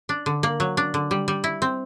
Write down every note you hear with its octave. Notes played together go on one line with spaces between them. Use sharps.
D4
D3
A#3
F#3
D4
D3
G3
G3
E4
C4